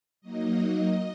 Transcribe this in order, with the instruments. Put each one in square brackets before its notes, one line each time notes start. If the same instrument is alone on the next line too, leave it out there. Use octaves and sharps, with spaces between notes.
[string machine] F#3 A#3 D#4 D#5